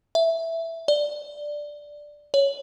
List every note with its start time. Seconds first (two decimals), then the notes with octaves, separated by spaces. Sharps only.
0.15 E5
0.88 D5
2.34 C#5